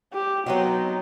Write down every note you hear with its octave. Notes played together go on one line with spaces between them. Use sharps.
G4
F#3 B3 C4 D#4